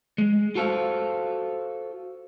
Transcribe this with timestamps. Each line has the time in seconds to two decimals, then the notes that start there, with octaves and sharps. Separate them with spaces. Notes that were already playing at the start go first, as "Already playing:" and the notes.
0.18 G#3
0.55 F4 F#4 A4 C5 F5